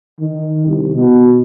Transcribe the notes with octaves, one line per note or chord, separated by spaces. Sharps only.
D#3
C2
B2